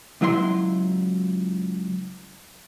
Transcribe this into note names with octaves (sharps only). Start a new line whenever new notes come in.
C#2 F#3 E4 E5 C6